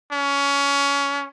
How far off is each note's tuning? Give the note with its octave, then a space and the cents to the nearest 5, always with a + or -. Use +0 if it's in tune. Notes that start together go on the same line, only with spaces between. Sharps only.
C#4 +20